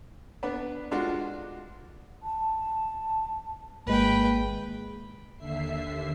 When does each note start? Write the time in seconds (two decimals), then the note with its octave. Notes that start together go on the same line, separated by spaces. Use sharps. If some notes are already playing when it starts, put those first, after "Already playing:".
0.43 B3 D4 B4
0.91 G#3 D4 F4 F#4
2.23 A5
3.87 G#1 G#3 A#3 B4 G5
5.37 D#2 D3 E5 C7